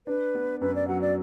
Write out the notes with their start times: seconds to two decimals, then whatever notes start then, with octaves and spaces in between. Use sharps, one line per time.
0.07 D4 B4
0.35 B3
0.61 F#2 B4
0.75 D5
0.88 F#3 F#5
1.02 D5